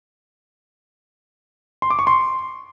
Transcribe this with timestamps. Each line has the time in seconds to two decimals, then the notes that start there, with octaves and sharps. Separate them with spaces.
1.82 C6
1.90 D6
1.99 C#6
2.07 C6